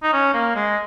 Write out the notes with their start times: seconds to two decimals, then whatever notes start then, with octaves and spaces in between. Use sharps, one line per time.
0.03 D#4
0.13 C#4
0.34 A#3
0.56 G#3